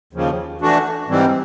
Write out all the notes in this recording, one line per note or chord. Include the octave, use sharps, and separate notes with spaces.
D#2 C#3 F3
E3 A3 D4 F#4
G#2 E3 G3 C4